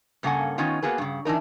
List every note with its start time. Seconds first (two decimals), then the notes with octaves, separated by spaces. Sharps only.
0.23 G2 C#3 A#3 A4 F#5 G#5
0.58 D#3 B3 C#4 D#4 F4
0.82 A#3 B3 F#4 G#4 B4
0.98 G2 C#3
1.25 E3 D4 D#4 A#4